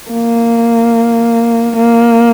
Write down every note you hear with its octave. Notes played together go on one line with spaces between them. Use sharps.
A#3
A#3